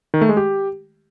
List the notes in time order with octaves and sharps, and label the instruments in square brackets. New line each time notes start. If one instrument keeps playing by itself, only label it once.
[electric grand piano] D#3
A3
G#3
G4